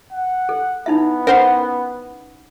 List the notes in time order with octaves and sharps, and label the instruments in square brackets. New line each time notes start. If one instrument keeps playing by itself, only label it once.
[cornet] F#5
[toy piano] A4
[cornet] B3 [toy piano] D#4 E4 E5
[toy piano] C#4 F#5 [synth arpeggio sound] A#4 C5 C6